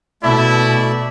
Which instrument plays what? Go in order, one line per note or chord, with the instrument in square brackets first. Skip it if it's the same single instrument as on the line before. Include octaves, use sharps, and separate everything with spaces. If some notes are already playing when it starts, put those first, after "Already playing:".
[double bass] B2 [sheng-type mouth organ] A3 D5 E5 [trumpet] E4